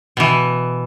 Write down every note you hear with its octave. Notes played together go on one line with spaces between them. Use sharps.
B2 E3